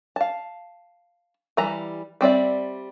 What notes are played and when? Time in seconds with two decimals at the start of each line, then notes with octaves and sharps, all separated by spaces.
0.16 F5 A5
1.57 E3 G3 A#5
2.21 G3 C4 D5 E5